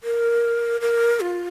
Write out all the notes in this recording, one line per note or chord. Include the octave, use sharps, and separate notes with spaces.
A#4
A#4
F4